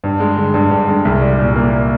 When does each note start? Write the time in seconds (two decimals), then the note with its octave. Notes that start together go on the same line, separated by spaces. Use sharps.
0.04 G2
0.20 G#3
0.37 D3
0.54 G2
0.71 G2
0.89 G#3
1.05 C2
1.22 G3
1.39 A#2
1.56 A#3